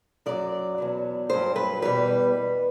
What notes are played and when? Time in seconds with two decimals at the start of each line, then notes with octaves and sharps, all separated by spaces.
0.26 F#2 F#3 D5
0.78 E2 B2 F#3
1.30 G2 F#3 C5
1.56 B4
1.82 E2 B2 G3 B4